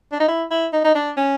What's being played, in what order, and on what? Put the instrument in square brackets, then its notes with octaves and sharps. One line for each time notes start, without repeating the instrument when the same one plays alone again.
[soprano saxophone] D4
D#4
E4
E4
D#4
D#4
D4
C#4